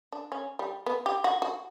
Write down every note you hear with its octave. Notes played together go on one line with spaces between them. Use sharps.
D4
C#4
G3
B3
G4
F#4
F#4